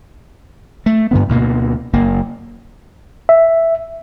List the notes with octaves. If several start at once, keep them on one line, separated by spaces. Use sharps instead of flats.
A3
G2 D3 B3
D2 B2 A#3
F#1 A#3
E5